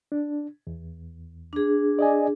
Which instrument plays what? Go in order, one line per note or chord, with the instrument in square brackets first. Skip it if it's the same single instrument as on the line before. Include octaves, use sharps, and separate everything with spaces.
[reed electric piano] D4
E2
[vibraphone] D4 G#4
[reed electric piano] D5 D#5 G#5